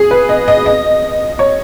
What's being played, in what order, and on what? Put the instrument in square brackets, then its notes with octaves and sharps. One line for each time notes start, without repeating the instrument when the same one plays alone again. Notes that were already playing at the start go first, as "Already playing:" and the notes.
Already playing: [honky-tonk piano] G#4
B4
D#5
D#5
D#5
C#5